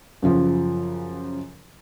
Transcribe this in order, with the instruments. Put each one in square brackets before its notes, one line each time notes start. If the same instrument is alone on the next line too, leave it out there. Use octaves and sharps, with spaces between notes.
[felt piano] F#2 C#3 F3